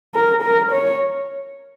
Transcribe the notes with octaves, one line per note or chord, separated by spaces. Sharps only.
A#4
A#4
C#5